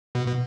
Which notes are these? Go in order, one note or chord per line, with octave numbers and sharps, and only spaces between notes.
B2
B2